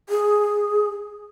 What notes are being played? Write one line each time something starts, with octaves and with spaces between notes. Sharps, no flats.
G#4